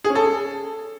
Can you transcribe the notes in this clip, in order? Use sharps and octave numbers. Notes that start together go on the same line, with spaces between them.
G#4
C#4
A4